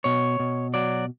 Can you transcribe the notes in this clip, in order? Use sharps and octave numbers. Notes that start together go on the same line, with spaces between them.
B2 C#5
B2
F#3 D5